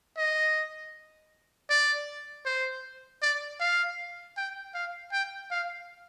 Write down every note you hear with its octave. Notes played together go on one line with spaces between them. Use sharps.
D#5
D5
C5
D5
F5
G5
F5
G5
F5